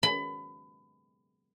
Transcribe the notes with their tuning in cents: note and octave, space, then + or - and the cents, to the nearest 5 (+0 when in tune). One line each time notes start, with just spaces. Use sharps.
B5 +25